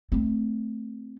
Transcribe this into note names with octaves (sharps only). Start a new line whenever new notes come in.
A3 C4